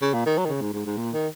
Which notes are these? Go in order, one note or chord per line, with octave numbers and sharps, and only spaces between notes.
C#3
A#2
D#3
F#3
D#3
C#3
G#2
G#2
G#2
A#2
D#3